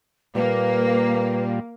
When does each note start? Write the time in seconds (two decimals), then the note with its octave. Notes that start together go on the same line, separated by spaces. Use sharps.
0.35 A#2 G3 A#3 B4